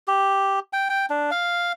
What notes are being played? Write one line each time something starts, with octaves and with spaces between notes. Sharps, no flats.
G4
G5
G5
D4
F5